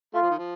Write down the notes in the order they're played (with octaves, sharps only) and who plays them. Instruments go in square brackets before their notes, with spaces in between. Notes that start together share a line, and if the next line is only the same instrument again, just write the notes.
[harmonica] A3 [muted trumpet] F4
[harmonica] F3
D#3
F3